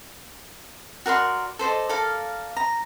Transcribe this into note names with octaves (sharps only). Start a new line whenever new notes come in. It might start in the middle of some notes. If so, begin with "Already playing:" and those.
F#4 A#4 D5 C6
A4 C5 D5 D#5
A4 A#4 D5 F5
A#5